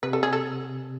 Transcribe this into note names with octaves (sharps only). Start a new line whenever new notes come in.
C3 B4
A4
G#4
A4